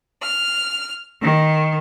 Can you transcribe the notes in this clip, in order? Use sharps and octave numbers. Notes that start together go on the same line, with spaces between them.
F6
D#3